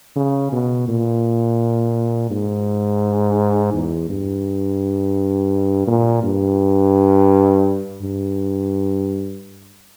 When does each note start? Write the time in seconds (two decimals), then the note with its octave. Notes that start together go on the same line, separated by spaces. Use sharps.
0.16 C#3
0.52 B2
0.88 A#2
2.30 G#2
3.74 E2
4.09 G2
5.87 A#2
6.24 G2
8.02 G2